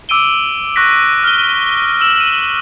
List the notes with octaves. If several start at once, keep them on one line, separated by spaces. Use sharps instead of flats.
D6 E6 D7 D#7 G7
C#6 F#6 A#6 B6
F6 G7
E6 E7 F#7
D#7